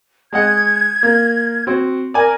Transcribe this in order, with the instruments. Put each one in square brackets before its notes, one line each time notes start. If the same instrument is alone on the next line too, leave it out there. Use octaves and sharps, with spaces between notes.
[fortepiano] G#3 D#5 F#5 [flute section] G#6
[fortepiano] A#3
C4 F#4
[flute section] A#4 [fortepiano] D5 G#5